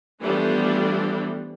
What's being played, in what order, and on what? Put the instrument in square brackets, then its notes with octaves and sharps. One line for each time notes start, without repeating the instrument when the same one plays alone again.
[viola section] E3 F3 G3 A3 B3 D4